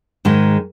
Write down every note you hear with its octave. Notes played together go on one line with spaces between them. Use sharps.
G#2 D#3 G#3